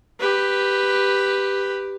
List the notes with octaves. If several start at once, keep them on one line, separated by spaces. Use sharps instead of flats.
G4 B4